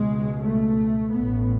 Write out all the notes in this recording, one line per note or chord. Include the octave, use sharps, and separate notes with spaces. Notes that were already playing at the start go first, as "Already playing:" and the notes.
Already playing: C#2 B2 G#3
A3
A1 A2 B3